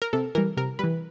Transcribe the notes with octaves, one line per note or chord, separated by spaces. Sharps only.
A#4
C3 A4
E3 G3 A#4
C3 A#4
E3 G3 B4